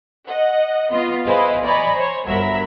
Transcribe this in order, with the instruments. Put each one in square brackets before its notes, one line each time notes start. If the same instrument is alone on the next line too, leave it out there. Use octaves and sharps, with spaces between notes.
[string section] D#5 F#5
B3 F4 D#5
E4 G#4 B4 C5 D#5 F5
D5 D#5 G#5 A#5 B5 C#6
C5 C#5
G1 F#3 A#4 E5 B5 A#6